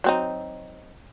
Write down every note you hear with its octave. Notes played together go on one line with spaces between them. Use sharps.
F#3 C4 D#4